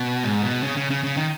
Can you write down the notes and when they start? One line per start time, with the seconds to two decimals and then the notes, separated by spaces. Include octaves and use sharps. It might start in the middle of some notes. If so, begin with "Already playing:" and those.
Already playing: B2
0.23 G#2
0.43 B2
0.63 C#3
0.77 C#3
0.90 C#3
1.04 C#3
1.17 D#3